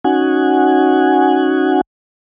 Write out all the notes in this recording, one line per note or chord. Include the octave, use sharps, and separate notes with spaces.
C#4 D#4 F#4 F#5 G#5